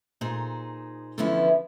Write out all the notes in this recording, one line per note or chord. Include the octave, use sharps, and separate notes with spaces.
A#2 D#4 G#4 C5
D3 E3 F3 B3 C#4 E4